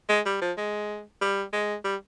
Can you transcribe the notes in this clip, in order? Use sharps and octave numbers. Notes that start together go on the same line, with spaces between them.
G#3
G3
F3
G#3
G3
G#3
G3